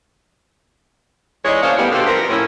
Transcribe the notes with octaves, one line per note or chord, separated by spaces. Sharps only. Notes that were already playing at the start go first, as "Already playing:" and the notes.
E3 G#3 D#4 G#4 C#5 D5
A#3 C#4 D4 C5 F5
A2 G3 A3 B3
B2 D3 F4 G4 A4
F3 B3 C4 A#4
A2 C#4 E4